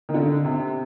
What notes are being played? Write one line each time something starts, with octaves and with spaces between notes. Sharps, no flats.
D#3
D3
C3